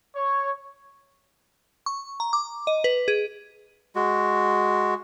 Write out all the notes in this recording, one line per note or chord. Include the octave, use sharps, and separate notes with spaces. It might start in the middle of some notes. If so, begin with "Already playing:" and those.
C#5
C#6
A#5
D6
D#5
B4
G#4
G#3 F#4